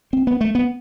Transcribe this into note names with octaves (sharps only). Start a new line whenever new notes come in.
C4
B3
A3
B3